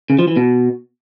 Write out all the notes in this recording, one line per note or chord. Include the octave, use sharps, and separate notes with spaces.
C#3
F3
E3
B2